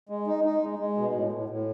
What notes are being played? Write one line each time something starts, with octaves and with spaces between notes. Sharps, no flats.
G#3
D#4
D#4
G#3
G#3
B2
A2
A2
A2